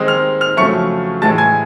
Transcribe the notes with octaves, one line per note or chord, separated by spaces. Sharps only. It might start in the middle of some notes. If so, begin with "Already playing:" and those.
Already playing: D#3 G#3 C4 D#4
F6 F7
F6 F7
F2 C#3 F#3 A3 C#6 C#7
A2 E3 G#3 A5 A6
G#5 G#6